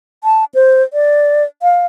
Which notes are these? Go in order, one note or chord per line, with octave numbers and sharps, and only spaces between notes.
A5
C5
D5
F5